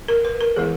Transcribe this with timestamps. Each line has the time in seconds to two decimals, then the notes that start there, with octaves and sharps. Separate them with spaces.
0.08 A#4
0.25 B4
0.41 A#4
0.56 E3 G#3 B3 E4 G#4